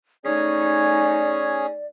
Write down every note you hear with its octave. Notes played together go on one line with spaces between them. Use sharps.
A3 C#4 D#4 G#4 C#5 D5